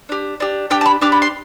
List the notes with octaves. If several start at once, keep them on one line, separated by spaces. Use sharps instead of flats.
D4 G4
D4 G4
D4 G4 G5
A5
B5
D4 G4 D6
B5
C6